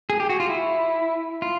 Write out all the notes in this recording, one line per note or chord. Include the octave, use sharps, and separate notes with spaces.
G#4
G4
F#4
F4
E4
F4